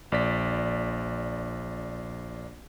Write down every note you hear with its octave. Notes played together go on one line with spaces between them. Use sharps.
A#1 D5 B6